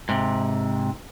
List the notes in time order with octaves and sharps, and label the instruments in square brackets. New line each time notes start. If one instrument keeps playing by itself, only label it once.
[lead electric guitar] G#2 C3